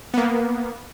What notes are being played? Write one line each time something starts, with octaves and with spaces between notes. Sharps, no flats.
A#3 B3